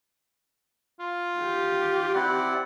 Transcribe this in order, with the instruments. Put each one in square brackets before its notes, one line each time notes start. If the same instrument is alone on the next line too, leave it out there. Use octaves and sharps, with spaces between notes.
[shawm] F4
[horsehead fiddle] G4
[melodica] C4 E4 D5 [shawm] F#5